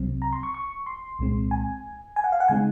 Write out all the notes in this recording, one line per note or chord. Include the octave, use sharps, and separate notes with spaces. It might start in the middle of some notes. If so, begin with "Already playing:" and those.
Already playing: C2 C3 F#3 C4
A#5
C6
C#6
C#6
C6
C2 A#2 G#3 C4
G#5
G#5
F#5
F5
F#5
C#3 G#3 C4 D#4 G#5